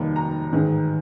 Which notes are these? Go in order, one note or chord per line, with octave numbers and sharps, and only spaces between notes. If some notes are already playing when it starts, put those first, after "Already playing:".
Already playing: F1 D#2 D#3 G3 A#3
A#5
A1 G#2 D#3